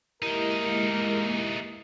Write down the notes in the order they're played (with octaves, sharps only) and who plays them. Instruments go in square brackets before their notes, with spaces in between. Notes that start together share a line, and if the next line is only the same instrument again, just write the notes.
[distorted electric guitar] E3 D#4 [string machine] G#3 A#3 [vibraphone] E4 G4 D#5 [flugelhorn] A#4